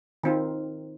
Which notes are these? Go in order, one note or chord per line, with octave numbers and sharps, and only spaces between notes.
D#3 C4 F4